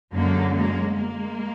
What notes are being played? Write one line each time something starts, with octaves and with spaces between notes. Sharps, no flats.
F#2 D3 F#3 G#3 A#3
G#3 A#3
G#3 A#3